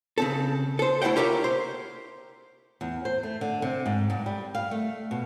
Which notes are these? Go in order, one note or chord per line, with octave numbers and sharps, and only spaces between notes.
C#3 C4 A4
A4 C5
A3 E4 C5 F#5 G5
F4 G4 A#4 C#5 D5 E5
C5
E2
C5
A3
D3
C3
G#2
G2
G3
F5
A3
B2